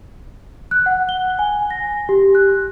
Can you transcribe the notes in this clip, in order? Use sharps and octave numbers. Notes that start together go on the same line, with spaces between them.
F#6
F#5
G7
G#5
A#6
G4
F#6